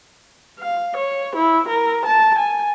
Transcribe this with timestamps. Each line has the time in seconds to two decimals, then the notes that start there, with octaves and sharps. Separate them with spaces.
0.59 F5
0.97 C#5
1.36 E4
1.69 A#4
2.06 A5
2.39 G#5